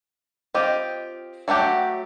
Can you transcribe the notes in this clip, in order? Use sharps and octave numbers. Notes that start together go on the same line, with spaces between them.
C4 F4 G4 D#5
F#3 A3 F#4 G4